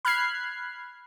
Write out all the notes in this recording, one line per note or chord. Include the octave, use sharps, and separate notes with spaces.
B5 F6 F#6 G#6 C7